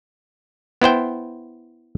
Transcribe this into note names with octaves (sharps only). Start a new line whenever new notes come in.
B3 E4 C5 G5